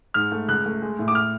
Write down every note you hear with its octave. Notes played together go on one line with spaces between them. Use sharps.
G#2 F6
A3
C#2 F#6
A3
G#3
A2
D6
F6